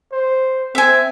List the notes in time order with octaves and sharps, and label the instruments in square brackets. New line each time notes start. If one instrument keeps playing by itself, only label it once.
[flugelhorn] C5
[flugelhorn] C4 [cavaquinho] E5 G#5